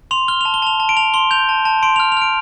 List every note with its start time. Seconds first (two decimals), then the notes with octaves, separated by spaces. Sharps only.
0.11 C6 F7
0.28 F6 G7
0.41 F7
0.45 A5
0.54 G7
0.62 A5 F7
0.80 A5
0.89 D7
0.97 A5 F7
1.14 C6 G7
1.31 G6 F7
1.49 A5
1.65 A5
1.83 C6 D7
1.96 F6 F7
2.12 F7
2.17 F6 D7